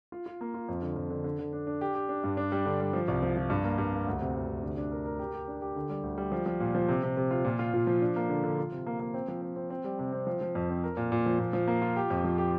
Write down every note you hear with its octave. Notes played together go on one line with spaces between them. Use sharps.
F4
F4
A#3
F4
F2
D3
F2
D3
D3
D3
D4
D4
G4
G4
D4
G2
D4
G3
D3
G3
F3
C2
F3
F3
G2
A#3
G2
A#3
D2
C3
D2
C3
D3
D4
A#4
A#4
G4
G4
D4
G4
D3
G3
D2
G3
F3
F3
A#2
F3
C3
C3
C3
F4
A#2
F4
A#2
F3
D4
A#3
D3
D3
F4
C3
A#3
A#3
C4
F3
C4
C4
C4
G3
C3
C4
F3
F3
F2
C4
A#4
A#2
A#2
F3
A#2
F3
A#3
F4
G4
F2
F3
G4